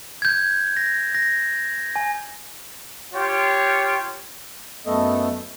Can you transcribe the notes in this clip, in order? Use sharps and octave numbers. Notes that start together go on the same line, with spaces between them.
G6 G#6
A#6
A#6
G#5
F4 G4 C#5
F#2 A3 B3 A4 D#5